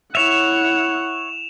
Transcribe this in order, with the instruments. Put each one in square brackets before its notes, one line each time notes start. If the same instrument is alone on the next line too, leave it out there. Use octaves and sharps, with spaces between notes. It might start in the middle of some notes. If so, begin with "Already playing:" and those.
[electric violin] E4 F#5 [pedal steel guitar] C#5 E5 [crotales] E7 F7